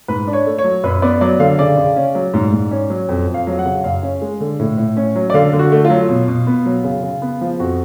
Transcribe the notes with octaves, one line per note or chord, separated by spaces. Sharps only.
G#2 B4
D4
C#5
A3
C#5
F#3
F#2 B4
B3 D5
F#3 D5
D3 F5
C#3 D5
C#3
C#4
F#3
G#2
G#2
C#4
F#3
F2
F2
F5
F#3
F#5
C#3
F#2 F5
C#4
G#3
D3
A2
A2
C#4
F#3
D5
D3 F5
D3
F#4
A3
F4
F#3
B2
B2
B3
F#3
C#3
C#3
B3
F3
F2 F#4